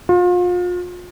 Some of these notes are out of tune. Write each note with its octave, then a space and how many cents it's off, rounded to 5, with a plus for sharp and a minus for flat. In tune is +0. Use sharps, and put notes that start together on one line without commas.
F4 +35